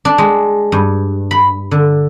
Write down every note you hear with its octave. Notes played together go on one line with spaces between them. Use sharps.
D4
G#3
G2
B5
D3